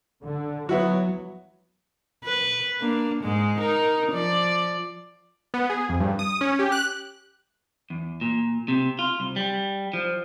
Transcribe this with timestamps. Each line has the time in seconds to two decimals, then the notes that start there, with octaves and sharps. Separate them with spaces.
0.24 D3
0.69 F#3 B3 E4 F#4
2.25 B4
2.81 A#3 D4
3.23 G#2 G#3
3.59 D#4 A#4
4.12 F3 D5
5.54 B3
5.70 G#4
5.89 F2
6.00 G2
6.19 D#6
6.41 C#4
6.59 G4
6.72 F#6
7.90 E2
8.21 A#2
8.68 C3
8.99 F4
9.20 C2
9.36 G3
9.93 F3